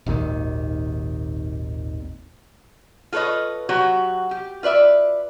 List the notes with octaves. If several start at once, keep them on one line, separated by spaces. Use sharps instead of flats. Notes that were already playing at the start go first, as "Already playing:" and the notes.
G#1 D#2 A#2 D#3
F4 A4 B4 C#5 D#5
F#3 F#4 G4
G4
F4 B4 D5 E5